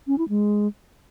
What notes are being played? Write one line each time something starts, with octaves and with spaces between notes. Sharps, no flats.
C#4
E4
G#3